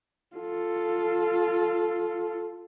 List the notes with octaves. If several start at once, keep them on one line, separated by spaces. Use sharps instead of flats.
F4 A4